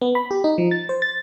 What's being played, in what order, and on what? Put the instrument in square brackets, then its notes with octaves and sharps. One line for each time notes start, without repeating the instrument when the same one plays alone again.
[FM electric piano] B3
B5
G4
D#4
F3
A6
C5
A6